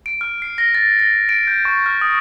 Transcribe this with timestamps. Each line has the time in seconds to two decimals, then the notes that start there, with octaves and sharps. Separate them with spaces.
0.06 D7
0.21 F6
0.42 C7
0.58 A#6
0.75 A6
0.99 A#6
1.29 D7
1.47 G6
1.65 C#6
1.86 F6
2.01 D#6